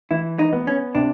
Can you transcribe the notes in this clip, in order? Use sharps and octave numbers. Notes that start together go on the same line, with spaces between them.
E3 E4
D#4
B3
C#4
C3 D4